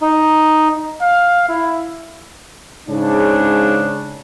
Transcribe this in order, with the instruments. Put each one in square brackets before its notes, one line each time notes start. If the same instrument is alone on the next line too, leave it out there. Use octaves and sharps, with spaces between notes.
[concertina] D#4
[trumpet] F5
E4
[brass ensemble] G#2 C#3 D4